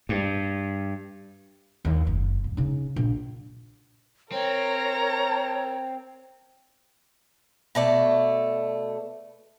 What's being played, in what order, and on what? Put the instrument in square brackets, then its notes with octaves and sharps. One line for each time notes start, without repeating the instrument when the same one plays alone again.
[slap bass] G2
[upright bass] D#2
F#1
D#1
C#3 D#4
A#1
[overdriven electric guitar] C4 [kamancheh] A#4 A#5 [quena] C#5
[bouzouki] B2 A3 D5